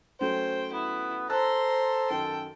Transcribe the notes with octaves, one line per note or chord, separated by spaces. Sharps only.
F#3 A3 C#4 C5 G5
B3 E4
A4 C5 A5 A#5 C6 E6 F#6
F#2 D#3 G5